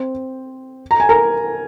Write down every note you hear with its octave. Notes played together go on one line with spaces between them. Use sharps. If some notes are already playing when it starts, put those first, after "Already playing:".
Already playing: C4 C5
A#5
G#5
A#4 A#5